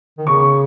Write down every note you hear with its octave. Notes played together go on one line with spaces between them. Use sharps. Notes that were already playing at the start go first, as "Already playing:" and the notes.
D#3
C#3 C#6